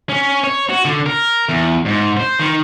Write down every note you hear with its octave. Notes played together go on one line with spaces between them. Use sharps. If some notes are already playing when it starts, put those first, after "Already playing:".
C#4
C#5
F#4
D3
A#4
E2
G#2
C5
D#3